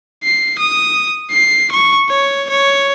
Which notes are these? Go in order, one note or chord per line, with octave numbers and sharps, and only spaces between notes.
C7
D#6
C7
C#6
C#5
C#5